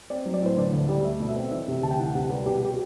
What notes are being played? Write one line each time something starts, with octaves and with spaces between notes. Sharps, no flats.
C4 D5
F#3
D5
A2 C5
D3 D5
D2
G3
A3 E5
B2
E5
C4
E3 E5
C3
D2 A5
G5
E3 F#5
C3 F#5
G3 B4
B2 G4
G4
F#4